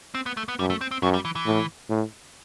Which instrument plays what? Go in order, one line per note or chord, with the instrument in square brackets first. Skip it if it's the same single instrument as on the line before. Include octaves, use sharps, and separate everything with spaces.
[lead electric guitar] C4
B3
A3
B3
[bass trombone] F#2 [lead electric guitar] G3
[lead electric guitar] A3
C4
C4
[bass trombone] F#2 [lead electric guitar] F#3
[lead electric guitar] G3
E3
E3
[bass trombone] A2
A2